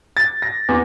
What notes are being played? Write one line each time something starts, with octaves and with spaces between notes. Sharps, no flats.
A6
A#6
E2